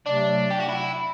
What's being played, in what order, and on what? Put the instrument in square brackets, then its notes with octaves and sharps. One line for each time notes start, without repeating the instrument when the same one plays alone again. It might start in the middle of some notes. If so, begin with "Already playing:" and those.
[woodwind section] C3 F#3 A3 [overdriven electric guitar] D4
[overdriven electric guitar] G4
F#4
E4